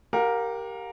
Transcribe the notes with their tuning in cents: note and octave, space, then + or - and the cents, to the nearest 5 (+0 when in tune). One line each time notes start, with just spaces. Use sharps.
G4 +0 A#4 +0 F5 +40